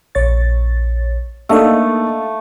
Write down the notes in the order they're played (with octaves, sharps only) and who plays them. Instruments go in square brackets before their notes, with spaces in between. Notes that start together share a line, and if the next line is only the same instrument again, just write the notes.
[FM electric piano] A#1 C#5 A6
[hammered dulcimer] A3 [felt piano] A#3 D4 D#4 [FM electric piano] A4 D#5 F5